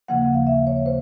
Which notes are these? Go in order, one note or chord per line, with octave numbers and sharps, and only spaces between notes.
D#2 C#3 F3 A#3 F#5
F#5
F5
E5
C#5
C5